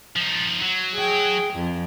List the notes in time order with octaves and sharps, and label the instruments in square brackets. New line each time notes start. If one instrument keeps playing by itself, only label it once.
[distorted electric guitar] F3 D#4
F#3
[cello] G#4 G5
F2